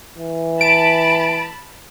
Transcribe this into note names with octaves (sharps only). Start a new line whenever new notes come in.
E3
A5 B5 D7